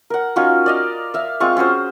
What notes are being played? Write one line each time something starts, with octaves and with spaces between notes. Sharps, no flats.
A#4 F#5
C#4 D#4 F4 F#4
D5 D#5 F5
E5 F5
G#3 C4 F4 C#6
C#4 F#4 G#4 C5